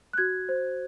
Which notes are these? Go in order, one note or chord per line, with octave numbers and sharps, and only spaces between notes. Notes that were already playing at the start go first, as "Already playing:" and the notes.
F#6
F#4 G#6
C5